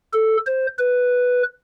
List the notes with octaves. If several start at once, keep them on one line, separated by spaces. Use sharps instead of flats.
A4
C5
B4